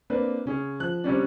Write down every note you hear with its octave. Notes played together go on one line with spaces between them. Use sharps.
A#3 C4 D4 B4
C#3 C#4 G#4
F3 F#6
C3 G3 C#4 D4